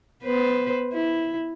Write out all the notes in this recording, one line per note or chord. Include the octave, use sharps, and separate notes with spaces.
B3 B4 C5
E4